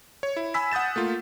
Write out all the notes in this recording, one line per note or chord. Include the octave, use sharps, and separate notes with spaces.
C#5
E4
G#5 B5 E6 B6
F#5 D#6 G6 A6 E7
A3 A#3 F4